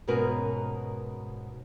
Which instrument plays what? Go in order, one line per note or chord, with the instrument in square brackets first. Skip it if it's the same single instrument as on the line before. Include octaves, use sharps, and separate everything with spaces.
[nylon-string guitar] G#2 B2 C#4 F#4 A#4 B4